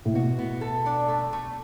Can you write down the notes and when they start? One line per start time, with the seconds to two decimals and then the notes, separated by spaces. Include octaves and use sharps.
0.05 A2
0.14 B2 F#4
0.38 B3
0.61 A4
0.86 D4
1.08 A3
1.33 A3